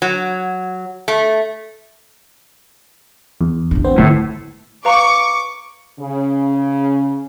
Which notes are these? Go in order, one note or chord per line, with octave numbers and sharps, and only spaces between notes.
F#3
A3
E2
A1 D4
B3 C4 C5
A2 D3
B4 F5 A#5 C#6 D6
C#3